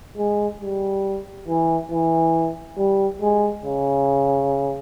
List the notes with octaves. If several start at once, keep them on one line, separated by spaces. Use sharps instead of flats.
G#3
G3
E3
E3
G3
G#3
C#3